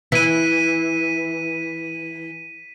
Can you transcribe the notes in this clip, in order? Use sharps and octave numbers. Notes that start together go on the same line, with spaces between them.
E3 B6 D#7